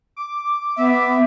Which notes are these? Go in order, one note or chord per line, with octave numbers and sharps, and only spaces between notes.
D6
B3 E5